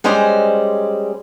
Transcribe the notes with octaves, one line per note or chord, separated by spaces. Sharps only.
G3 G#3 C#4 C5 D5 D#5